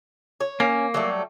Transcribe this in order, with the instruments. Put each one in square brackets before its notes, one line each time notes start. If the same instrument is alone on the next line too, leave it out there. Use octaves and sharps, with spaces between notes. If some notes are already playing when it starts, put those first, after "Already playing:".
[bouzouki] C#5
[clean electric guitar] A#3 [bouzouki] C#4
[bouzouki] F#3 G3 A3